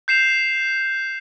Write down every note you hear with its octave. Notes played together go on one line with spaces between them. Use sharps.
G6 C7 E7 F7